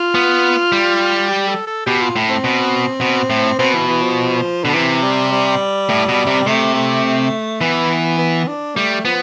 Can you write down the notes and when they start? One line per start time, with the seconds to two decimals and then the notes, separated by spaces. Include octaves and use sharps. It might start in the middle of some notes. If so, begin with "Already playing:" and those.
Already playing: F4
0.15 B3
0.72 G3
1.29 G4
1.48 A4
1.67 A4
1.86 B2 G4
2.01 F4
2.16 A2
2.29 C4
2.44 B2
3.01 B2
3.30 A2
3.59 B2 C4
3.74 E3
3.87 E3
4.02 F3
4.64 B2 D3
4.73 C3 E3
5.03 G3
5.32 G3
5.89 A2
6.09 B2
6.27 C3
6.47 C3 A3
6.75 A3
7.61 E3 B3
8.18 B3
8.48 D4
8.76 G3 A3
9.05 F3 B3